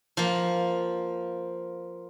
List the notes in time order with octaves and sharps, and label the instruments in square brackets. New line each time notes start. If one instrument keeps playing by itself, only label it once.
[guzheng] F3 A#3